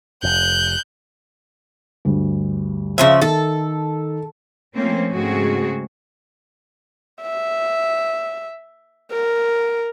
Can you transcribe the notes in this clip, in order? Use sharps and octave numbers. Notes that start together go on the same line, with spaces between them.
F1 F#6 G6
D2 G2
C#3 F3 E5
D#3 A4
F3 A3 A#3 C4 C#4
G#2 C#3 A3 C4 F#4 G#4
E5
A#4